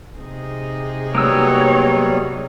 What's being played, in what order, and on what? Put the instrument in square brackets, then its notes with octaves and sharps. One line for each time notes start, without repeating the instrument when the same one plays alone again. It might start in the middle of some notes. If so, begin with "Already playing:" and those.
[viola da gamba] C3 D#4 G#4
[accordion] F#3 G3 [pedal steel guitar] A#3 B3 E6 [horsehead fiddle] C#5